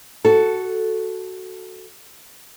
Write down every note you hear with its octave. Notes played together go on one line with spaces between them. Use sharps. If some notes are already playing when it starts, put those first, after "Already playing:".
F#4 A4